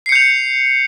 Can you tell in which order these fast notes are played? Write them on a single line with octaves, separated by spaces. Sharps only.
C7 C#7 G6 F7